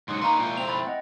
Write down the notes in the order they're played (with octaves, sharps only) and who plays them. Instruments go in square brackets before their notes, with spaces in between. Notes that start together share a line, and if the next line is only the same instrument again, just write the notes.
[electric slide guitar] G#2 F#3 [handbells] C6 D#6 C#7
[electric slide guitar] A#3 D#4 B4 [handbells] D5 F5 C#6 [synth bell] A#5 C6
[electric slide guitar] F2 E4 G5 [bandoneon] A#2
[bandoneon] C4 [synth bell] F7
[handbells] E5 A6 [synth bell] B5
[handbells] D#5 F#5 G5